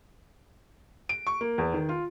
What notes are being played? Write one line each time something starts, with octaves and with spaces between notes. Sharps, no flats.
D7
C#6
A#3
E2
D#3
F4